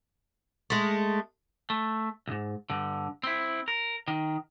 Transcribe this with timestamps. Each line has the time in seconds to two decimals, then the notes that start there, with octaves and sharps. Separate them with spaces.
0.70 G#3 A3
1.70 A3
2.27 B1 G#2
2.70 G2 D3
3.23 C4 E4
3.68 A#4
4.08 D#3